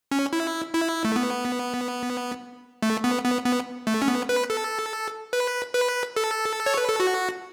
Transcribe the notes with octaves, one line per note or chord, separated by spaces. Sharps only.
C#4
E4
E4
A3
B3
A3
B3
B3
B3
A3
C#4
B3
B4
A4
B4
B4
A4
C#5
B4
A4
F#4